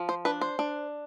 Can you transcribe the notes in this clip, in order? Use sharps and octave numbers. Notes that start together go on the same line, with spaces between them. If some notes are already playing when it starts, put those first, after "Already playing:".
Already playing: F3
C5
D4 B4
C5
D4